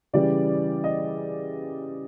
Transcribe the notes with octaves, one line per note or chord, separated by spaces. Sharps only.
C#3 E3 G3 D5
D#5